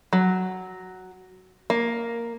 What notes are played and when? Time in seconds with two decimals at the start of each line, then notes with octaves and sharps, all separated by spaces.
0.13 F#3
1.70 A#3